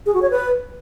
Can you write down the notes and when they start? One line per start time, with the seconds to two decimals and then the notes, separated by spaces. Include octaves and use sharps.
0.06 G#4
0.14 F#4
0.22 C#5
0.30 B4